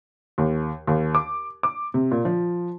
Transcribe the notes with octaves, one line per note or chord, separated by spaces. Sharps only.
D#2
D#2
D6
D6
C3
A#2
F3